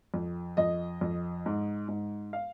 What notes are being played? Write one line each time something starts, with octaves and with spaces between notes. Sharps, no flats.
F2
F2 D#5
F2
G#2
G#2
F5